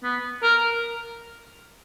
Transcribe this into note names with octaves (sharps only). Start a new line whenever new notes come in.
B3
A#4